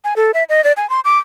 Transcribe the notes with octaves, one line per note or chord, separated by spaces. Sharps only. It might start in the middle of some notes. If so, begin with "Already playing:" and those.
G#5
A4
E5
D#5
D5
G#5
C6
D6